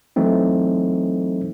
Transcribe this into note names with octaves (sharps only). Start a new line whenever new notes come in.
E3 F#3 A3 C4 D#4